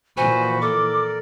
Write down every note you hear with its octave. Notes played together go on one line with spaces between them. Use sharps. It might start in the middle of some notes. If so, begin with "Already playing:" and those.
A#2 E3 F3 F#4 C5 G#5 B5 C#6
A4 A#4 D5 D6